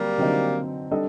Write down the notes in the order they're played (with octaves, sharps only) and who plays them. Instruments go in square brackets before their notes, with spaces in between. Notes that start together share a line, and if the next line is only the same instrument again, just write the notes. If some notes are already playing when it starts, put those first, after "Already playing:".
Already playing: [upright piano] D3 F#3 C4 [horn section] G3 A#3
[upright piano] D3 F#3 C4 D#4
G3 D4 A4 D#5